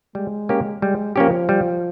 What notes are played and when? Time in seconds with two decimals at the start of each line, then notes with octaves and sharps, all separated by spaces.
0.15 G3 G#3
0.49 A#3 C#4 G4
0.82 G3 G#3
1.16 F3 A#3 C#4 G4
1.49 G3